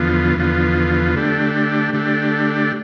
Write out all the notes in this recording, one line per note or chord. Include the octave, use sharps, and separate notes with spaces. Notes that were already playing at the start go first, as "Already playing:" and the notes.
Already playing: E2 D3 F3 B3 F4
E2 D3 F3 B3 F4
D3 A3 D4 G4
D3 A3 D4 G4